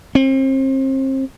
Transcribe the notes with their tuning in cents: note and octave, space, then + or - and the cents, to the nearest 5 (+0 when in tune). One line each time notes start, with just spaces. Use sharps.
C4 +35